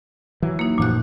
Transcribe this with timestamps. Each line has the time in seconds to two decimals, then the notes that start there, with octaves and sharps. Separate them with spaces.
0.42 E3 F#3
0.59 A#3 D#4
0.78 A1 F#2 A#2 F3 F#6